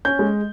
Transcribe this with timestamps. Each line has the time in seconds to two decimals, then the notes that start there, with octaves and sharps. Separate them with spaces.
0.05 C#4 G6
0.19 G#3